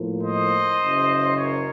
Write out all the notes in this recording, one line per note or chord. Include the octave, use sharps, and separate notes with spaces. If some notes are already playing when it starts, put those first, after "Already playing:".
Already playing: A2 F3 A#3
C5 D#5
F#1 F#2 C#3
A#4 C#5